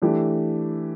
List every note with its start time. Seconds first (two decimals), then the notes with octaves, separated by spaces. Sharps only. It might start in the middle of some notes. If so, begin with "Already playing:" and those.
0.02 E3 A3 D4 G4